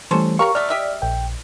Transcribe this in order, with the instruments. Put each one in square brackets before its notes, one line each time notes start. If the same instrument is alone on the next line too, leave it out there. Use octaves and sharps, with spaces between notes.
[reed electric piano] E3 G3 A3 [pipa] C#4 A4 C5
[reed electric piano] G4 A#4 F5 [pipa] C#5 A#5 C#6
[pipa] F#3 A3 [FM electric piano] D5 [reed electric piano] F6
[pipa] G4 D#5 E5
[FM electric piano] A#1 [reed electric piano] G5